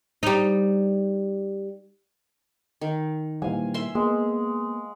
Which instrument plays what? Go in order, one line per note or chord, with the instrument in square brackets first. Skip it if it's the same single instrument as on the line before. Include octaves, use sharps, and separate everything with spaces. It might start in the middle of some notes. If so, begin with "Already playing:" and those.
[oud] G3 D#4
[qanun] D#3
[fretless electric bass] A#2 E3 G3 [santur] F5 G#5
[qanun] E5 C6
[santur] G#3 [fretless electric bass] A#3 B3